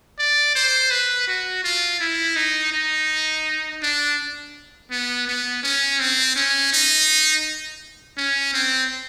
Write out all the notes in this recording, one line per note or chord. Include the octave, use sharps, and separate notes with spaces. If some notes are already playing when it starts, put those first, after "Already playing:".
D5
C5
B4
F#4
F4
E4
D#4
D#4
D4
B3
B3
C#4
C4
C#4
D#4
C#4
C4